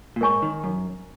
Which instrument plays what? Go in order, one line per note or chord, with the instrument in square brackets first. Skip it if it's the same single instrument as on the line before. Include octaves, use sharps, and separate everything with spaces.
[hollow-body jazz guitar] A#2
[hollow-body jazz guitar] G#2 [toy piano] A#4 C#5 G#5 C#6
[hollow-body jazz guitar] D#3
F#2